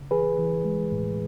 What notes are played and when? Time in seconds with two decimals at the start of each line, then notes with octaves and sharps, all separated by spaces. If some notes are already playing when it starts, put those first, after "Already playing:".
Already playing: C#3
0.11 E3 G#4 B4
0.39 E3
0.65 G#3
0.92 A2